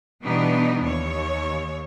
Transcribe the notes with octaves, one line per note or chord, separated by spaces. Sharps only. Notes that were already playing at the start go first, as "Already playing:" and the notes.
B2 E3 G3 B3 D4 D#4
D#2 C#5